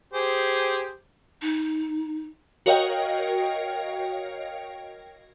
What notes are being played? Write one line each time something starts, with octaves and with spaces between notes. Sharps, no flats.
G4 G#4 C5
D#4
F#4 A#4 C#5 D#5 F5 G5